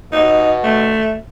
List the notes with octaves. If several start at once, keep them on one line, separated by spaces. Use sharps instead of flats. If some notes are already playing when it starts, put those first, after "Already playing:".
B2 D#4
A3